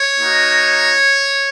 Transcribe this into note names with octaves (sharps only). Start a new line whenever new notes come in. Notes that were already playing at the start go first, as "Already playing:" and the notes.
Already playing: C#5
A#3 D#4 F#4